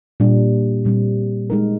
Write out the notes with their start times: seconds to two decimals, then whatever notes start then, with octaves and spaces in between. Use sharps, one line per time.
0.20 A#2 G3 D4
0.85 A#2 G3 C4
1.50 G#3 D#4 A#4